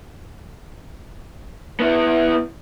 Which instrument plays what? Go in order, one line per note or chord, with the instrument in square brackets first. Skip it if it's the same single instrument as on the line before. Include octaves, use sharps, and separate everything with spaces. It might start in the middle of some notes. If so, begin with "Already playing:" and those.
[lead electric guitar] B3 E4